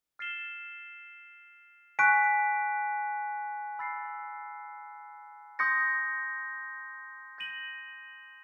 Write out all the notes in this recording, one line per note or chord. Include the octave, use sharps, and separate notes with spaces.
F6 A6 C7 E7 G7
G#5 C#6 F#6 B6 D7
B5 E6 A6 C7
C6 D#6 G6 A#6 C#7
G6 A#6 D#7 F#7